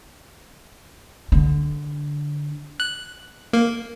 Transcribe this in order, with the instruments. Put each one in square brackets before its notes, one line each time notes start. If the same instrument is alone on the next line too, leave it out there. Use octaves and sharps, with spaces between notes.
[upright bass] D3
[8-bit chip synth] F#6
A#3